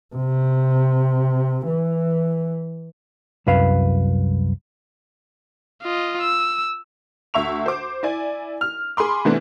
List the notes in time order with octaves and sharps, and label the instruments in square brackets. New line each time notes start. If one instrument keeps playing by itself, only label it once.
[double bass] C3
E3
[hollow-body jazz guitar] C2 F#2 B4 F5
[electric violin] F4 D#5
E6
[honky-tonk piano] D2 E5 C#6 F7
C5 D6
E4 D5 G#5
F6
G#4 B5 C6 D6
C3 E3 A3 B3 D4 E4